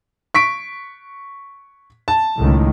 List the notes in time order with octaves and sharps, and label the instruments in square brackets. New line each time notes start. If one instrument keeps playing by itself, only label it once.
[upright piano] C#6 B6 D7
A5
[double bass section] C#2 A2 D#3